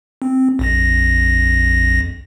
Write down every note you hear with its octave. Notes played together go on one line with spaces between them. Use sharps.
C4
A#1 F2 A#6